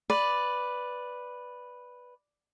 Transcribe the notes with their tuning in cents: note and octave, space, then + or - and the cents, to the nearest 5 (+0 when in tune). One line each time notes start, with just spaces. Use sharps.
B4 +0 D5 +0